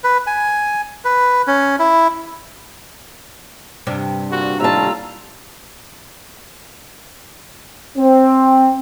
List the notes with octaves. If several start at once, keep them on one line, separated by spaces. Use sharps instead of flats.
B4
G#5
B4
C#4
E4
G2 C3 D4
A#2 G3 F#4
D#2 A2 G3 F4 A5 A#5 E6
C4